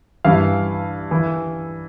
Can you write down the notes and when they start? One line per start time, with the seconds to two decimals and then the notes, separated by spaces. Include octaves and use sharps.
0.25 G2 E3 F5
1.11 E3